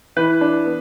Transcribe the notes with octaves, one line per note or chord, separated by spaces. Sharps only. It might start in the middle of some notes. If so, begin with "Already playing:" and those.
E3 B4
D4
B3